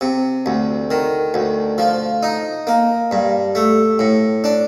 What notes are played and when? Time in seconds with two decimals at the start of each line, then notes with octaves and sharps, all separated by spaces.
0.01 C3
0.46 D2
0.91 D#3
1.34 D2
1.78 F3
2.23 D#4
2.67 A#3
3.11 G2
3.55 A3
3.99 A2
4.44 D4